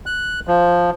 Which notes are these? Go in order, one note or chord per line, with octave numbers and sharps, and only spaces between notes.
F#6
F3